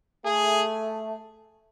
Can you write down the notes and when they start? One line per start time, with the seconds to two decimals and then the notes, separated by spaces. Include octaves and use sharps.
0.25 A3 G#4